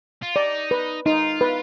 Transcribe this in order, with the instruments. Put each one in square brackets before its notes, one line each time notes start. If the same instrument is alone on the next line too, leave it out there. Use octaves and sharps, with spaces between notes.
[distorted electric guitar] F4
[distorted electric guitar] D#4 [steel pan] D5
[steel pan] B4
[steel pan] D#4 [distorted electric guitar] F4
[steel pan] B4